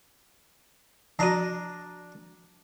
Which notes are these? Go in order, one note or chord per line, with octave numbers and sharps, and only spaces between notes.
F3 D4 F#4 A#5